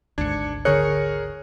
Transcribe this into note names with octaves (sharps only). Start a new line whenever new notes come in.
G#1 D2 G#2 D4 G#6 C#7
D3 G#4 A#4 C#5 C#6 F#6 C#7